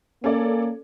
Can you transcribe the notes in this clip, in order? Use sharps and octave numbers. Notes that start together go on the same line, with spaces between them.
A#3 C#4 A4 D5